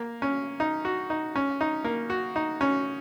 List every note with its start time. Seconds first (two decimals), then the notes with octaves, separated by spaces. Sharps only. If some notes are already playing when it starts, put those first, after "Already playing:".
Already playing: A#3
0.22 C#4
0.60 D#4
0.85 F#4
1.10 D#4
1.36 C#4
1.61 D#4
1.84 A#3
2.10 F#4
2.36 D#4
2.61 C#4